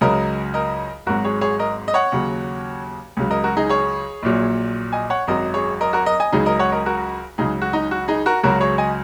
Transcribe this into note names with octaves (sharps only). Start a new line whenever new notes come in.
C#2 C#3 F#3 A#4 D#5
A#4 D#5
G#1 G#2 F#3 F#4 A#4
G#4 C#5
G#4 C#5
A#4 D#5
D#5
C#5 F#5
D#2 C#3 F#3
C#2 C#3 F#3
A#4 D#5
F#4 A#4
D#4 G#4
G#4 C#5
A#1 A#2 F#3
D#5 G#5
C#5 F#5
G#1 F#2 F#3 A#4 D#5
G#4 C#5
A#4 D#5
F#4 A#4
A#4 D#5
D#5 G#5
C#2 C#3 F#3 D#4 G#4
A#4 D#5
C#5 F#5
A#4 D#5
F#4 A#4
C#2 C#3 F#3 D#4 G#4
F#4
D#4
F#4
D#4 G#4
F#4 A#4
C#2 C#3 F#3 F#4 A#4
G#4 C#5
D#5 G#5